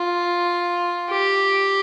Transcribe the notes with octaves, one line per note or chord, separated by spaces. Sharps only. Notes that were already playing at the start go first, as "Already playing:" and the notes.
Already playing: F4
G4